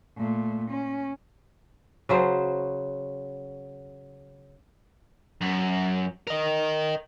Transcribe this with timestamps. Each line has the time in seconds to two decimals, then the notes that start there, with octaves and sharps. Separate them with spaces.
0.18 A#2 A3
0.71 C#4
2.09 C#3 F#3 C5
5.41 F#2
6.27 A#4 D#5